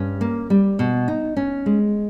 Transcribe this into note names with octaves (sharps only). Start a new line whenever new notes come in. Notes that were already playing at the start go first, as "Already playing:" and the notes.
Already playing: G2 C#4
A#3
G3
B2
D#4
C#4
G#3